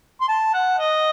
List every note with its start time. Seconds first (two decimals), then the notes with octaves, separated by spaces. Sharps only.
0.21 C6
0.28 A5
0.54 F#5
0.78 D#5